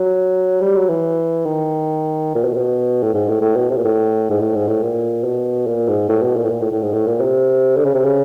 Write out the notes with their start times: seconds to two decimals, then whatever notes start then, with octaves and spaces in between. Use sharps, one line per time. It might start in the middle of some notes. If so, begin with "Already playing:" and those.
Already playing: F#3
0.61 G3
0.76 F#3
0.89 E3
1.46 D#3
2.35 A#2
2.44 B2
2.53 A#2
2.57 B2
3.03 A2
3.14 G#2
3.28 A2
3.41 A2
3.56 B2
3.70 C3
3.77 A#2
3.85 A2
4.30 G#2
4.40 A2
4.55 G#2
4.67 A2
4.82 A#2
5.24 B2
5.67 A#2
5.88 G#2
6.09 A2
6.22 B2
6.36 A#2
6.44 A2
6.50 A#2
6.61 A2
6.72 A2
6.82 G#2
6.93 A2
7.07 A#2
7.21 C3
7.76 D3
7.85 C#3
7.94 C3
8.04 C#3